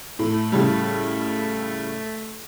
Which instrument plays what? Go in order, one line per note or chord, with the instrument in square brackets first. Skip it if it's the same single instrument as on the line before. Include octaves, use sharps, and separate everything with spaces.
[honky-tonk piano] A2 [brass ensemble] A3
[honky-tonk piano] A2 C#3 G3